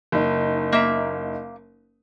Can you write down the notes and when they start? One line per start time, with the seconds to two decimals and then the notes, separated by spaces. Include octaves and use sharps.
0.12 F#1 D#4
0.72 A#3 E5